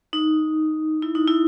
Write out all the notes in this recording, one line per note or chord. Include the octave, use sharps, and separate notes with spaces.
D#4
E4
D#4
E4